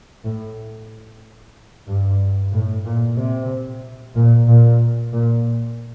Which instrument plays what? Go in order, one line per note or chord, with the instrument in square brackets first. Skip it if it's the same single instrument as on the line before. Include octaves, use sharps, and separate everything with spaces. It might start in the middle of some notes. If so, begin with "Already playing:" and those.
[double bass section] A2
G2
A2
A#2
C3
A#2
A#2
A#2